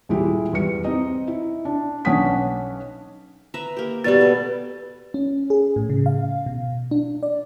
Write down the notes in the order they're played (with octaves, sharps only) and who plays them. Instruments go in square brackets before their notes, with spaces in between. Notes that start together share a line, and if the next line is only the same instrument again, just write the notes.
[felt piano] D#1 G#3 E4 G4
E2 G3 C#7
C4 D#4 D#5
E4
D4
B1 C#4 D4 F#5 D#6 B6
[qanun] B4 E5 A#5
A#3 G4
[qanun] B2 G3 B3 [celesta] G4 D5 A6
[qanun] A4
[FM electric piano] C#4
G#4
A2
C#3
F5
B2
D4
D5